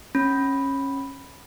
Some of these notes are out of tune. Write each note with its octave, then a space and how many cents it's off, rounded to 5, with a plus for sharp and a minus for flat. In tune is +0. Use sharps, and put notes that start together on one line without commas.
C#4 -20 B5 +0